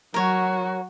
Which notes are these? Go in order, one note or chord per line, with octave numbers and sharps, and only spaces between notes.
F#3 F#4 A#4 C#5